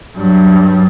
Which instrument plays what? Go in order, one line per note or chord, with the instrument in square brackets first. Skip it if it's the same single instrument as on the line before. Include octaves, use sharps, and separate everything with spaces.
[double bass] G2 F#3